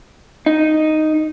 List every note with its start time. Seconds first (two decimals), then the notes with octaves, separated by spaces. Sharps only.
0.46 D#4